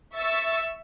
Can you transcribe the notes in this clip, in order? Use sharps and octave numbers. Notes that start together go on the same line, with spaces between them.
E5 C#6 E6 A6